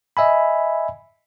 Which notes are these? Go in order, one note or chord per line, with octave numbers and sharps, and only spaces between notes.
D#5 E5 G#5 B5